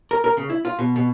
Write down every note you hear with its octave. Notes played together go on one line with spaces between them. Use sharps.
A#4
A#4
C#3
E4
F4
B2
B2